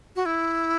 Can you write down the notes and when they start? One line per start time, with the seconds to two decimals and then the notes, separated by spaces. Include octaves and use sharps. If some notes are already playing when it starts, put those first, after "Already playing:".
0.16 F#4
0.26 E4